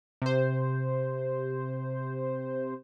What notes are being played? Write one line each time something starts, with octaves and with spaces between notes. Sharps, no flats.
C3 C5